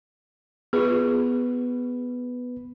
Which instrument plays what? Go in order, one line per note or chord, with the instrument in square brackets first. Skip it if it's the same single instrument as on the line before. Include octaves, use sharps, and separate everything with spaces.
[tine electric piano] B3 B4 [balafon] F4 G#4